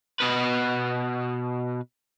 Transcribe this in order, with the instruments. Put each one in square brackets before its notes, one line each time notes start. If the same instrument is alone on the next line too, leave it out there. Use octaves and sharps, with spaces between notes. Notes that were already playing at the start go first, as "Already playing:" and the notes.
[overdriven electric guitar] B2 B4